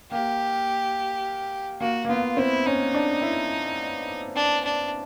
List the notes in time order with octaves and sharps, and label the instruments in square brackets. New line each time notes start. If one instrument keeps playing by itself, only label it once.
[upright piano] A#3 [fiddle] G4
[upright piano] A#3 [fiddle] F#4
[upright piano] A#3
[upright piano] B3 [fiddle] F4
[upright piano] C4 [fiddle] E4
[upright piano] C#4 [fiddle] D#4
[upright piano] D4
E4
[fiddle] D4
D4